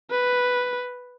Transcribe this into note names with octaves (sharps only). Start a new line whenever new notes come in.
B4